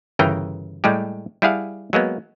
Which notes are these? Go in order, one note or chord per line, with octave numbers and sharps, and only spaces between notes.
G1 C#3 E3 A#4 G5 A#5
A2 G3 G#3 G4
G3 E4 G#4 F5 F#5
F#3 G#3 A#3 B3